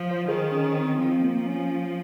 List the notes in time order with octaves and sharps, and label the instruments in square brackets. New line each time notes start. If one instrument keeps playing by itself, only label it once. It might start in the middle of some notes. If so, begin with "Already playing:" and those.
Already playing: [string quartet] F3
[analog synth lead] C5
[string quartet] D#3 [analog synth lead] G#4
[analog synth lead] C#4
C4
[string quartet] F3 [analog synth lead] C4
[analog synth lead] A#3
C#4